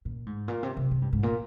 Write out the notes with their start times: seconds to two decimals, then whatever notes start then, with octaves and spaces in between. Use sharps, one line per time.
0.05 A#2
0.26 G#2
0.48 A#2
0.63 C3
0.77 C3
0.91 C3
1.02 G2
1.13 G#2
1.23 A#2